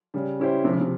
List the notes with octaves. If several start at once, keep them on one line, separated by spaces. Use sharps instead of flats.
C#3 G3
C#4 E4 G4 C5
C3 F3
C#3
C3